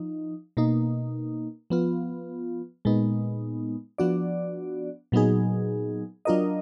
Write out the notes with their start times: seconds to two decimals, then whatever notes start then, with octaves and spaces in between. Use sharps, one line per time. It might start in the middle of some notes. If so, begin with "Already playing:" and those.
Already playing: F3 D#4
0.57 B2 A#3 D#4
1.70 F3 B3 F4
2.85 A#2 G#3 B3 D#4
3.98 F3 B3 D4 F#4 D5
5.12 A#2 F#3 B3 D#4 G#4
6.25 F#3 D4 F4 A#4 D#5